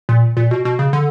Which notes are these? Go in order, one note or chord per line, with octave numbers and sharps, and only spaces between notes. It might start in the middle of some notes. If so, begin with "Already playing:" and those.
A#2
A#2
B2
B2
C#3
D3